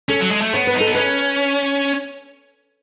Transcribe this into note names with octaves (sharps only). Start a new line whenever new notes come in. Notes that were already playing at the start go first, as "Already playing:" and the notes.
C#4 A4
F#3
G#3
A3
B3 C#5
B4
D#4
A4
B3
C#4 B4